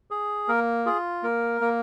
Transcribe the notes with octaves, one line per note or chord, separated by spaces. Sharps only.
G#4
A#3 A#4
F4 G#4
A#3 A#4
A#3